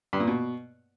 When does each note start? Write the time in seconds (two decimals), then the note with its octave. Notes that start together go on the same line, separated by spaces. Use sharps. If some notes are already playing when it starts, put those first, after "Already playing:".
0.13 G2
0.20 A#2
0.28 B2